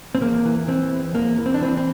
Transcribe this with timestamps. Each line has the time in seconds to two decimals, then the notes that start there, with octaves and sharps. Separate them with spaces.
0.15 C4
0.22 E2 A#3
0.45 E3
0.68 E3 C4
0.91 E2
1.15 E2 A#3
1.38 E3
1.46 C4
1.54 D4
1.61 E3 C4
1.77 C4